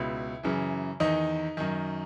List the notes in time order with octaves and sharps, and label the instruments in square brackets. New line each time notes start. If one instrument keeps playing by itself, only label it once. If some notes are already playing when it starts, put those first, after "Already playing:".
Already playing: [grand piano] C#2 B2 E4
F#2 C#3 E3
E2 D#3 D#4 D#5
F#2 D#3